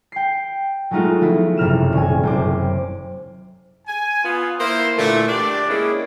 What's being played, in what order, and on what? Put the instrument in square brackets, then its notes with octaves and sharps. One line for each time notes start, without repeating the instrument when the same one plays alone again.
[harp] G5 C7
F#3 G#3 A3 D#4 F4 F#4
F3 B3 E4
F#1 C3 F6 E7
D#1 G#5
F#1 C5 D6
[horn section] G#5
B3 F4
A#3 E4 C5
A#2 D3 E3 A3
D4 G4 D5
G#3 A#3 C#4 E4 G#4